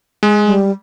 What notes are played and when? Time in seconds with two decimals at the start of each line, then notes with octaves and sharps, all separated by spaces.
0.23 G#3
0.46 G3